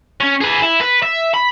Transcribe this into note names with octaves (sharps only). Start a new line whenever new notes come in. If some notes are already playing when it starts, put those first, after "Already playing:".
C#4
G#4 B4
E4
B4
E5
B5